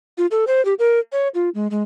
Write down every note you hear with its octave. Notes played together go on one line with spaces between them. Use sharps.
F4
A4
C5
G4
A#4
C#5
F4
G#3
G#3